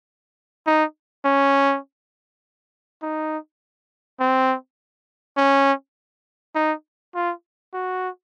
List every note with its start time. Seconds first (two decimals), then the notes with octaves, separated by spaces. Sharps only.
0.66 D#4
1.25 C#4
3.02 D#4
4.20 C4
5.37 C#4
6.55 D#4
7.15 F4
7.74 F#4